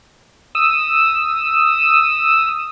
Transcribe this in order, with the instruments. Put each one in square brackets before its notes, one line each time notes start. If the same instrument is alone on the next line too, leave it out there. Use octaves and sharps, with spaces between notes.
[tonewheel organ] D#6 E6